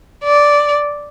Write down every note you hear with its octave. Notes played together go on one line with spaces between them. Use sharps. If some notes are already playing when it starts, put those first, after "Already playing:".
D5